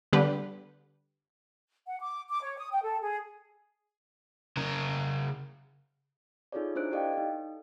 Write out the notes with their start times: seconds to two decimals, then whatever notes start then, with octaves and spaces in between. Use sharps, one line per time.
0.13 D3 G3 B3 G4 B4
1.86 F#5
2.01 D6
2.29 D6
2.41 C#5
2.57 D#6
2.71 G5
2.82 A4
3.01 G#4
4.57 C#3 A#4
6.52 D#4 F4 G#4 A4 C#5 D5
6.75 D4 E4 C5 F#6 D7
6.91 G4 A4 D5 D#5 F5 G5
7.13 D#4 A4